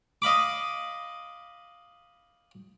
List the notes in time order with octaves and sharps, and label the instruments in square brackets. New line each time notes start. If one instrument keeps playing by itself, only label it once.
[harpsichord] D#5 F5 B5 D6